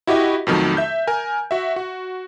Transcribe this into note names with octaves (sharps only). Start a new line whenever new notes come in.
E4 F#4 G4 D#5
F2 B2 D#3 F#3 A3
E5 G6
A#4 G#5
F#4 E5
F#4